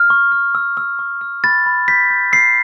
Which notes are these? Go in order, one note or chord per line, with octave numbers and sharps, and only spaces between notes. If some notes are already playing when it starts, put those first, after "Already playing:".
Already playing: F6
C#6
F6
E6
E6
C#6
E6
B5 A6
B5
G6 B6
G6
E6 C7